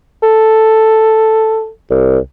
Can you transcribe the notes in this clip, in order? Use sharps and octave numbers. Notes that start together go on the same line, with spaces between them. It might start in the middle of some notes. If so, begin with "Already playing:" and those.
A4
C2